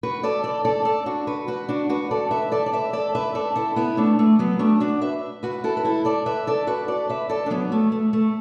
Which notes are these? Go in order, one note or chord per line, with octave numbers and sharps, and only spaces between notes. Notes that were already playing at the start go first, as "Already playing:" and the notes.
F#4 B4
A4 D5
A4 D5
A4 D5
A4 D5
D4 F#4
F#4 B4
F#4 B4
D4 F#4
F#4 B4
A4 D5
B4 E5
A4 D5
D5
B4 E5
A4 D5
B4 E5
A4 D5
E4 A4
B3 E4
A3 D4
A3
F#3 B3
A3 D4
D4 F#4
B4 E5
F#4 B4
E4 A4
B4
E4 A4
A4 D5
B4 E5
A4 D5
F#4 B4
A4 D5
B4 E5
A4 D5
D4
F#3 B3
A3
A3
A3